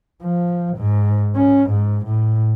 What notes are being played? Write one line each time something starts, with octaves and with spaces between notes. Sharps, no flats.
F3
G#2
C#4
G#2
A2